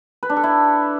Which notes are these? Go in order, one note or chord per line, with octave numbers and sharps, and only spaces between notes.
B4
D4
A4
E4